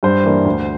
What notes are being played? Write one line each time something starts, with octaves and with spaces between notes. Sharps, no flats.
G2 C5
E3 A#3 D4
D2